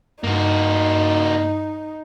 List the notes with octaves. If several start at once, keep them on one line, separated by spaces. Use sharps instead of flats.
G2 A#3 D#4 F#4